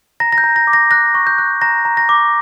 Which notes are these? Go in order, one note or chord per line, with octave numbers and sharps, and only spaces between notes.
A#5 A#6
A#6
G6
A#5
A#6
D6
A#6
F#6 A#6
C#6
G6
F#6
A#5 A#6
A#5
A#6
D6